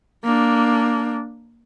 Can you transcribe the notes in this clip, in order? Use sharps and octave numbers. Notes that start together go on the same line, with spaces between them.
A#3 D4